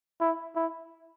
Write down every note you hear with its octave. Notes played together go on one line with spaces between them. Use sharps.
E4
E4